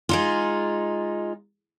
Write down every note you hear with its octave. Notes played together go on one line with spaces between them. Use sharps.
G#3 D#4 F4